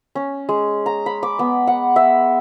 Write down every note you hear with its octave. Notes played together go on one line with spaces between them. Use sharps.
C#4
G#3
A#5
B5
D6
B3
F#5
E5